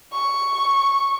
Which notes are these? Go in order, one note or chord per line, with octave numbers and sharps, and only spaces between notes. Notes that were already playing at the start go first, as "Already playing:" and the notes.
C#6